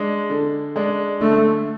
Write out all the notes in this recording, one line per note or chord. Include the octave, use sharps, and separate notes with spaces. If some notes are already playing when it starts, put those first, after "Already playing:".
Already playing: G#3 D4
D3
G#3 D4
D3 A3